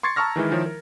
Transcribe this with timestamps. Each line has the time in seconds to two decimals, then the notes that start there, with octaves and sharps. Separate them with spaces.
0.03 C6 C#6 G#6 A6 C7 C#7
0.16 A5 A#5 C#6 E6 F6 A#6
0.36 D#3 E3 G#3 E4
0.51 D#3 F3 E4 C#5
0.66 A#4